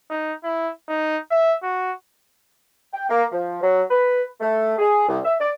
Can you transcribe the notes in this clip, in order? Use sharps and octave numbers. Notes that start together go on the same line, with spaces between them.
D#4
E4
D#4
E5
F#4
G5
A#3
F3
F#3
B4
A3
G#4
C2
E5
D5